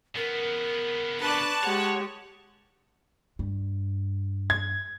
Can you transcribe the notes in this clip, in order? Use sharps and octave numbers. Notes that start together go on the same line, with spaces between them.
C#3 B3 A#4
D4 B4 D5 A5 C#6 F#6
G#3 G4 C#5 F#5
G2
G#6